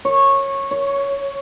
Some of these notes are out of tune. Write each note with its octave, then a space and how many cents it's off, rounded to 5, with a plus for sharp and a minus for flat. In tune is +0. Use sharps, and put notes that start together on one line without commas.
C#5 -15
C#5 +10